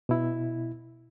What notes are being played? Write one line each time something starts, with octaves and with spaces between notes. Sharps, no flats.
B2 E4